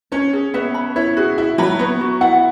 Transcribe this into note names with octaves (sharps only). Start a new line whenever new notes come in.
C#4 C#5
G#4
B3 E5
B5
E4 C#5
F#4 G#4
E4 E5
F#3 B5
B3 C#5
F#4
E4 F#5